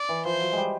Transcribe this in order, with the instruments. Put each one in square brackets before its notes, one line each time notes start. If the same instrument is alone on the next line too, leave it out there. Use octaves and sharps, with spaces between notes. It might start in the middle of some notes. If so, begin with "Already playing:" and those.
Already playing: [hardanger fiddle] D5
[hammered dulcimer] E3
[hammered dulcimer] F3 [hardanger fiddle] C5
[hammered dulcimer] F#3
G3 G#3